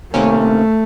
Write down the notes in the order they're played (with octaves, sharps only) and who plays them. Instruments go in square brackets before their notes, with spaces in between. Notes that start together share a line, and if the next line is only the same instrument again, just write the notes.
[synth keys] C3 D#3 A#3 C#4 [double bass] A3